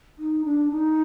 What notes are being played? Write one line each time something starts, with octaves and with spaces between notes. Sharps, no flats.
D#4
D4
D#4